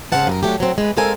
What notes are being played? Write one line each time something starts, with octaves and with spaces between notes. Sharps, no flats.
G#2 C#3 C4 F5 F#5 A5
F#2 G4 A#4
F#3 A3 D4 G4
F#3 C4
G#3 B4
G#3 C4 A4 A#4 F5 G#5